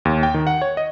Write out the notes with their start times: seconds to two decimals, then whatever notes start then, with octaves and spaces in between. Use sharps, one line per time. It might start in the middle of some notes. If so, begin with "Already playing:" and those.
0.05 D#2
0.23 G5
0.34 D#3
0.47 F#5
0.62 C#5
0.77 D#5